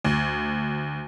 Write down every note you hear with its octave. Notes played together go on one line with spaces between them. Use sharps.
D2